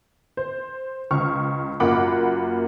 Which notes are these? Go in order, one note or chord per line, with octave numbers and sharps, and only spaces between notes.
C5
C#2 C#6 F6
F#2 A#3 F4 F#5 B5 D6